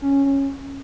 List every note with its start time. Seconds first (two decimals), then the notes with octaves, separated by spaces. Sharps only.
0.02 C#4
0.25 C#4